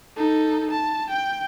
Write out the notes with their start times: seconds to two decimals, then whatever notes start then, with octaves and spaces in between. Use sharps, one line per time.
0.17 D#4 A4
0.71 A5
1.10 G5